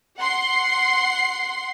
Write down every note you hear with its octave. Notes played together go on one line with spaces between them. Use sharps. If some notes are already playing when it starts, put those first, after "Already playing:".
F#5 C6 C7